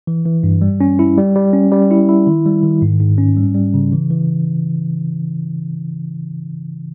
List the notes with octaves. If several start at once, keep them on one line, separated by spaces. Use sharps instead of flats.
E3
E3
G2
G3
C#4
E4
G3
G3
C#4
G3
E4
E4
D#3
G3
D#3
G#2
G#2
C#4
G3
G3
C#3
E3
E3